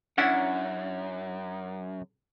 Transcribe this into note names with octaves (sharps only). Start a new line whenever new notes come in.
F#2 C#4 D4 E4 F#5